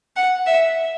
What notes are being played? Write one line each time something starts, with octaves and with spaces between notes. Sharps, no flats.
F#5
E5